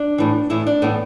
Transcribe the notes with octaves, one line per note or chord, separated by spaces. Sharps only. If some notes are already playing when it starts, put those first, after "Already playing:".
Already playing: D4
A2 E3
A2 E3 E4
D4
A2 E3 B3